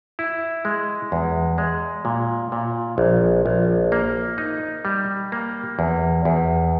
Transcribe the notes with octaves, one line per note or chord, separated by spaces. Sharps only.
E4
G#3
E2
G#3
A#2
A#2
A#1
A#1
A#3
D#4
G3
A#3
E2
E2